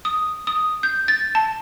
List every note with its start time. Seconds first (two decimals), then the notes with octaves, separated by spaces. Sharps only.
0.05 D#6
0.47 D#6
0.83 G6
1.08 A6
1.35 A5